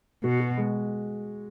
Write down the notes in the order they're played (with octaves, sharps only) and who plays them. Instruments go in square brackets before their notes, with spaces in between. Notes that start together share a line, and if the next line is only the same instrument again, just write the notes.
[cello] B2 [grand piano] F#4
[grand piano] F#4
G#3